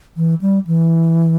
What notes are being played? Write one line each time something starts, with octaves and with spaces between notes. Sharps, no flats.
E3
G3
E3